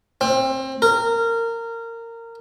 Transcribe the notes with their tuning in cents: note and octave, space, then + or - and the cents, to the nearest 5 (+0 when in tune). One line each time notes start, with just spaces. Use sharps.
C4 +25
A#4 -20